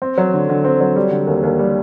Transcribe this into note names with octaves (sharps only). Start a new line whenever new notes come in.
C4
F#3
D3
D3
C4
F#3
G3
D3
D#2
D#2
G3